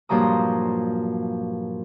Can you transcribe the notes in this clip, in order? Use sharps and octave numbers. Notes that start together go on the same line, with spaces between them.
G2 A#2 F3 F#3 A#5 D#6